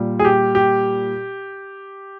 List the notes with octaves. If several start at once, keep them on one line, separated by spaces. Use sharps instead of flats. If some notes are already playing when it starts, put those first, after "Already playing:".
Already playing: A#2 G3
G#4
G4
G4